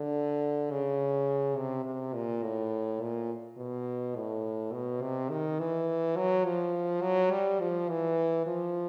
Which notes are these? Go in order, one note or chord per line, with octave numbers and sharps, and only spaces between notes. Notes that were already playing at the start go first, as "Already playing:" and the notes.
Already playing: D3
C#3
C3
C3
A#2
A2
A#2
B2
A2
B2
C3
D#3
E3
F#3
F3
F#3
G3
F3
E3
F3